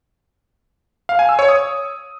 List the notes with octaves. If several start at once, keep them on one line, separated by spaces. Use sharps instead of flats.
F5
G#5
E6
C#5
D#6